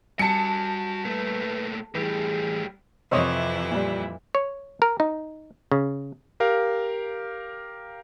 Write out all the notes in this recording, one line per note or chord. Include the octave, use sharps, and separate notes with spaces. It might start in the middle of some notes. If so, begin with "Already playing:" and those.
G3 F#4 G#5 A5 C#7
A#2 A3 B4
A2 E3 G3 G#4
F2 C3 E3 E4 C5 C#5 D#5
A#2 G3
C#5
A#4
D#4
C#3
G4 A#4 F5